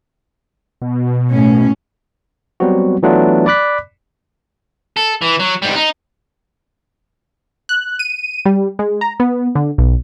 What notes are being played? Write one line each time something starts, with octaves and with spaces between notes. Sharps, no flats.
B2
A2 C#4
F#3 G3 B3 C4 F#4
E3 F#3 A3 B3 D4 F4
D5 B5 D6 F#6 B6
A4
E3
F#3
G#2 G3
D#4
F#6
D#7
G3
G#3
A#5
B3
D3
B1